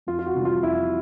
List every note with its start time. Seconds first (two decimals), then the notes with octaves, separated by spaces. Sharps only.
0.07 F2 F4
0.19 F4
0.26 F#4
0.35 C3 E3 G3
0.45 F4
0.63 F2 E4